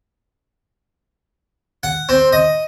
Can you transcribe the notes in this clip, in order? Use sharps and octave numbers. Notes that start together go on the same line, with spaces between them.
F#5
C4
D#5